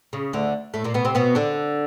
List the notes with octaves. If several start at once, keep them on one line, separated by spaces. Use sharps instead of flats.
C#3
D2 D3
A2 A3
A#2 A#3
B2 B3
C3 C4
B2 B3
D3 D4